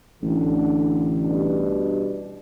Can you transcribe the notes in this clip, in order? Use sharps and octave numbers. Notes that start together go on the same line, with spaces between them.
A1 D3
B2 G3 D4